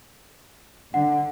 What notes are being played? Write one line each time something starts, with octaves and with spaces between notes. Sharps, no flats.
D3 F#5